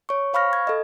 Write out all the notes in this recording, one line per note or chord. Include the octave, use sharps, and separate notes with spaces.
C#5 C#6
C5 F5 B5 C#6 F6 A#6
G#6
A4 D#5